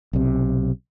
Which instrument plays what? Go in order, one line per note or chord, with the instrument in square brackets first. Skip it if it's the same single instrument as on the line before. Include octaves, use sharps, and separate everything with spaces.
[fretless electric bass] B1 C3